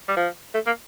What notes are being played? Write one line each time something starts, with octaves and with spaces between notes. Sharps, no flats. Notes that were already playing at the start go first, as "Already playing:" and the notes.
G3
F3
A3
A#3